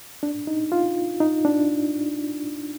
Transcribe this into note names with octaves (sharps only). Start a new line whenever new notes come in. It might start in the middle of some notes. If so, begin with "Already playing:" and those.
D4
D#4
F4
D#4
D4